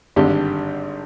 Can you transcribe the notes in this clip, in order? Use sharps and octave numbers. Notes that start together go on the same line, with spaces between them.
G#1 G2 D3 G4